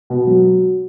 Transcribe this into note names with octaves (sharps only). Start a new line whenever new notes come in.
B2
F#3